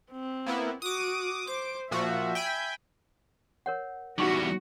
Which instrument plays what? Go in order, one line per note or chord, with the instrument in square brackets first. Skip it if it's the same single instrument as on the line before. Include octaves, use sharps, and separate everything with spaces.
[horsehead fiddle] C4
[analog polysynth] A#3 B3 E4
[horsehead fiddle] F#4 [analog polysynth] D6 D#6
[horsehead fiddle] C5 [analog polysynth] D6
[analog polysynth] A#2 F3 F#4 [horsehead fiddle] E5
[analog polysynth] G5 G#5 B5
[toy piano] A#4 C#5 F#5
[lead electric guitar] E2 G3 [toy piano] D#4 C#6 [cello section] F#4